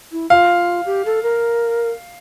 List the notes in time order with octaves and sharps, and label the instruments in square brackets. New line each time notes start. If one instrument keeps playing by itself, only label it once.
[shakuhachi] E4
[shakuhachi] F4 [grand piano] F5
[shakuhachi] G4
A4
A#4